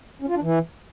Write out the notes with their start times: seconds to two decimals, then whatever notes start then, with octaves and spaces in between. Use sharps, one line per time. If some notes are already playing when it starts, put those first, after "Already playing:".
0.22 C#4
0.29 F4
0.35 D4
0.42 E3